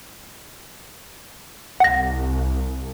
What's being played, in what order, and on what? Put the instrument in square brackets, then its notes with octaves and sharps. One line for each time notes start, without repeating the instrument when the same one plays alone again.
[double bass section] C2 [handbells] F#5 A#6